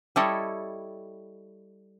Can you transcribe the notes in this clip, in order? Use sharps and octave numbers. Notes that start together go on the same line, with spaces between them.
G3 E4 A4 C#5 D#5